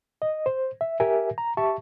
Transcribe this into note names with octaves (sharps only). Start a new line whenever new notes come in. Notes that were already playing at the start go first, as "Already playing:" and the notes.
D#5
C5
E5
G4 A#4 E5 G#5
A#5
G4 E5 A5 C#6